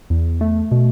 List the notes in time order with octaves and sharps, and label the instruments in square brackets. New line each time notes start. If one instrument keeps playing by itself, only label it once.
[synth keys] E2
A3
B2